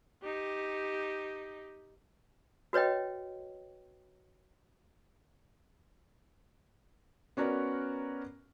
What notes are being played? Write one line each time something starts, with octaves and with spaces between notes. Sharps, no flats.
D#4 G4
F#4 B4 C#5 D#5 G5
B3 C#4 F#4 A#4 D5